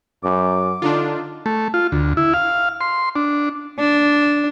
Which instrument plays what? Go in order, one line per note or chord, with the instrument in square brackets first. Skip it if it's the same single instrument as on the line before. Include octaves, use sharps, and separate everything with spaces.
[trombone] F#2 [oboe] D6
[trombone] D3 [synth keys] D4 D#4 F4
[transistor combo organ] A3
F4
D2
E4
F5
C6
D4
[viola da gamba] D4